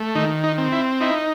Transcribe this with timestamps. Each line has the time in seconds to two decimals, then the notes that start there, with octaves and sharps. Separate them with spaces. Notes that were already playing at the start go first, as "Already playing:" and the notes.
Already playing: A3
0.15 D#3 D#4
0.44 D#4
0.58 C4
0.72 E4
1.01 D#4 E4